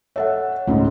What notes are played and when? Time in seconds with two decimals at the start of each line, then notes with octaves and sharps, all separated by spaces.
0.16 A4 C#5 E5 F#5
0.68 C#2 G#2 A3 C#4